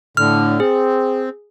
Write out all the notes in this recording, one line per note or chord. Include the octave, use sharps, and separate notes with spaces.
A2 D3 F6
C4 G#4